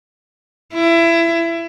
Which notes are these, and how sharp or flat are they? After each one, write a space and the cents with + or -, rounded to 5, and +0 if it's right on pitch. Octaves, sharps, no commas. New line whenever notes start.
E4 +25